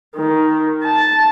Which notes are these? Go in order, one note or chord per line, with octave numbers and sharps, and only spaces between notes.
D#3
A5